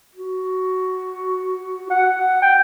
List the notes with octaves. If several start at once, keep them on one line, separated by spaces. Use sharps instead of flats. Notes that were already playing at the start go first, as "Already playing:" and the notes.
F#4
F#5
G5